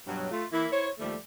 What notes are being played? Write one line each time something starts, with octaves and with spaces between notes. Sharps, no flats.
G2 B2 F#3
A3 F4
E3 A#3 E4
E4 C5 C#5
D#2 F3 G3 A3